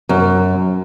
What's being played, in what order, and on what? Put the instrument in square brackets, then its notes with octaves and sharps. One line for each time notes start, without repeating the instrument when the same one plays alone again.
[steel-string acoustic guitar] F#2